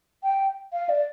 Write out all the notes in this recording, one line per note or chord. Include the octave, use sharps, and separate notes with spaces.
G5
F5
D5